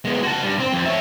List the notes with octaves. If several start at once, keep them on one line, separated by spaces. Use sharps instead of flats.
G#3 B3
F#4 A5
G2
C4
F2
C#5 E5